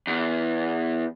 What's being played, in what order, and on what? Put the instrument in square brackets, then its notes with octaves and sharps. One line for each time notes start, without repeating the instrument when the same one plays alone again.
[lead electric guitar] E2